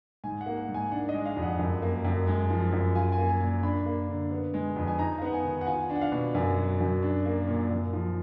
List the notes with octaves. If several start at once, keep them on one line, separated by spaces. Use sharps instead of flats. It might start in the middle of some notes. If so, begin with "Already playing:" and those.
G#2 G#5
F#5
A#3
F#5
G#2
G#5
D4 F#5
D#5
G#3
F5
F2
F#5
F#2
A#3
F#2
G#3
F3
F#2
F4 G#5
G#5
A#3
G#5
A#2
D4 B5
A#3
D3
B3
G#3
F2
G#5
D#4 A#5
F5
B3 F#5
G#5
D#3
F#5
F4 G#5
D4
F#5
F5
B2
F#2 G#5
F#3
F#2
D4
A#3
A#2
F#2
F3